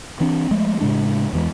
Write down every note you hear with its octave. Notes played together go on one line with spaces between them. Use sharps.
E3 C4 D4
F3 G#3 A3
A2 C#3 G#3 D4
E2 E3 G#3